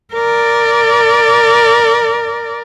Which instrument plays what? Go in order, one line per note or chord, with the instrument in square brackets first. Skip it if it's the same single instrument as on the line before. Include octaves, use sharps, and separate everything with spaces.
[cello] A#4 D5